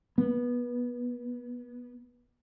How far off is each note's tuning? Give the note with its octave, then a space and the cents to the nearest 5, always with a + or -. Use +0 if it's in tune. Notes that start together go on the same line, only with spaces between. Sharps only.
B3 -20